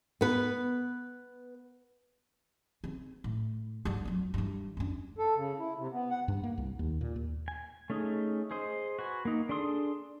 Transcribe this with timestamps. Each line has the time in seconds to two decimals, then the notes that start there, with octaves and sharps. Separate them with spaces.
0.21 B3 B4
2.84 C#3 C4
3.24 A2
3.85 G2 D3
4.05 F2 F#3
4.34 G2 E3
4.77 F#2 D4
5.19 A4
5.35 C#3
5.59 E4
5.77 C3
5.92 B3
6.10 F#5
6.28 G2
6.44 A#3
6.58 C2
6.79 D#2
7.01 A#2
7.16 D#2
7.48 G#5
7.90 A3 C#4 D#4 G#4
8.51 G#4 C5 D#5
8.99 F#4 B4 G#5
9.25 A#3 D#4
9.49 D4 G#4 A4 C6 D#6